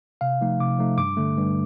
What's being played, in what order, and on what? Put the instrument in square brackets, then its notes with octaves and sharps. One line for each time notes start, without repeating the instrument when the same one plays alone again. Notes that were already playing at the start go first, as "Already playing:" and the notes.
[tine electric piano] C3 F5
F3 A3 D#4
C3 D6
F3 A3 D#4
G2 D6
D3 A3
G2